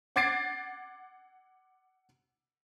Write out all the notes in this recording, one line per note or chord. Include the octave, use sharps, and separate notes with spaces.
F#5 D6 G#6 A6 C7 D7